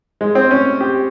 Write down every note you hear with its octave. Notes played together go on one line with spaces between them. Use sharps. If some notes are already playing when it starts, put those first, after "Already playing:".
G#3
C4
C#4
G4